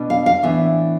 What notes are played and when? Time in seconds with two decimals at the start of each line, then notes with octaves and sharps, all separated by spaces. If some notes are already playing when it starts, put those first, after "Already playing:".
Already playing: B2 B3 D4
0.10 F5
0.26 F5
0.43 A2 E3 B3 D4 E5